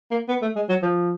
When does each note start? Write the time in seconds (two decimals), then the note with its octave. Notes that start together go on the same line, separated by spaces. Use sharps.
0.11 A#3
0.28 B3
0.42 A3
0.56 G#3
0.69 F#3
0.82 F3